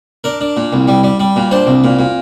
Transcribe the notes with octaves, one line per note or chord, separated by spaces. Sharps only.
D4 A#4
D4
A#2
C2
G3
G3
G3
A#2
D4 C5
C2
A#2
A#2